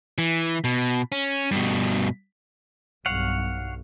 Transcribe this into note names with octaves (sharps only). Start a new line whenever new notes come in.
E3
B2
C#4
G2 B2
B1 G2 C#5 F5 F#5